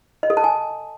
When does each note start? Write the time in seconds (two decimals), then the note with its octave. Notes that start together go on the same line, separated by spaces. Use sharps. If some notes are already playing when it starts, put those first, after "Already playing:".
0.23 D#5
0.30 A4
0.37 A5
0.44 G#5